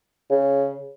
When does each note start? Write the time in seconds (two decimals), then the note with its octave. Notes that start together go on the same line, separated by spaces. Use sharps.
0.30 C#3